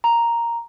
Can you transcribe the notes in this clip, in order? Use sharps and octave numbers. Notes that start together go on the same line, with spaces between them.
A#5